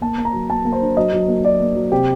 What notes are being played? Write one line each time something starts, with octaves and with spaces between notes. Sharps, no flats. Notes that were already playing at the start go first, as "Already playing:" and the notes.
A#3 A5
A#3
A#5
F#3
A#3 A5
A#3
C5
D4
F#3 D#5
F#3
A#3
F#3 D5
A#3
F#3
C3 G4